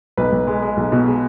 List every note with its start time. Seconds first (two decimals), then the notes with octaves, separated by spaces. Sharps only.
0.17 B1 B4
0.32 B1
0.47 G#3
0.62 G#3
0.77 B1
0.92 B2
1.06 G#3